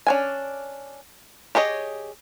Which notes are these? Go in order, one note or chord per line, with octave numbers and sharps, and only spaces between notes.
C#4 D4 G#5
G4 G#4 C#5 D#5